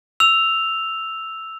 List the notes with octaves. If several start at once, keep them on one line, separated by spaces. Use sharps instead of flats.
E6 F7